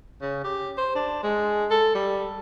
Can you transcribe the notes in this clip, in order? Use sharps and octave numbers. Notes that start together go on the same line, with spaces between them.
C#3
G4
C5
D4
G#3
A4
G3